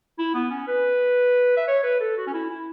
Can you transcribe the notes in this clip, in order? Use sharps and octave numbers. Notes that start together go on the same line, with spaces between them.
E4
B3
C#4
B4
E5
C#5
B4
A4
F#4
C#4
E4
E4